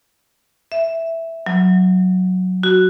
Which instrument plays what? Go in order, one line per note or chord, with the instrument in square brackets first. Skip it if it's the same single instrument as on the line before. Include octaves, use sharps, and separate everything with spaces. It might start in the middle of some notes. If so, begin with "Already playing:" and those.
[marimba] E5
F#3
F#4